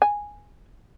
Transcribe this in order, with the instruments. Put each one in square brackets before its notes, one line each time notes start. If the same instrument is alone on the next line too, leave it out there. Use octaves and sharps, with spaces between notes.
[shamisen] G#5